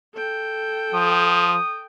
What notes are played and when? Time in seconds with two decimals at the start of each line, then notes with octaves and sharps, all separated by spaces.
0.14 A4 G5
0.94 F3 D#6